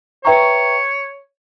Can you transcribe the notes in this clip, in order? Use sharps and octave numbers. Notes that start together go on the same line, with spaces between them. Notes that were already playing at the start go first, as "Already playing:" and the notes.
B4 C#5 E5 G5 A#5 C#6